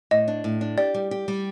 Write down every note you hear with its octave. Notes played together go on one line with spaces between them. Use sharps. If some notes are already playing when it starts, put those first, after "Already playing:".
A2 D#5
D4
A2
D4
G4 D5
G3
G4
G3